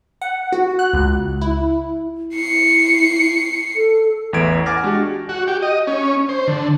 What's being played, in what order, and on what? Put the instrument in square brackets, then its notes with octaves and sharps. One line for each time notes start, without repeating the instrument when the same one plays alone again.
[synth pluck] F#5
F#4
F#6
C#2
E4
[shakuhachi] E4 [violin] C7 C#7
[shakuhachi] A4
[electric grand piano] A1 E2 B4 E5 G#6 D7
F#5 G#5 D6 F6 A6 A#6
G#3 D4 F#4 G4
[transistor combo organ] F#4
G4
D#5
C#4
C5
D3